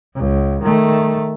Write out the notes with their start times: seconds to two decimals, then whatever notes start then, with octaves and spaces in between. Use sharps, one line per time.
0.16 C#2
0.63 D#3 A3